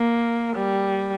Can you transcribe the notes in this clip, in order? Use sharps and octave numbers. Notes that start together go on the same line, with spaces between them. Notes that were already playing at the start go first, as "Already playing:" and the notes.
Already playing: A#3
G3